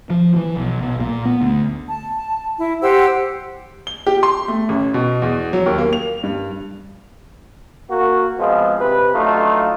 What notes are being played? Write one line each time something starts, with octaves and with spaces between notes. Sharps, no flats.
F3
E3
B1
B1
A#2
B3
D2
A5
E4
G4 C5 F#5 E6
G7
G4
C6
A3
A1
B2
E2
F#3
D#2
A#3
F7
G2
A#3 F#4
F3 G#3 B3 C4 F4
C3 B4
F#3 A3 D4 D#4 F4